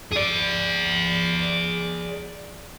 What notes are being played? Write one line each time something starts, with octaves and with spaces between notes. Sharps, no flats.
G#4 D5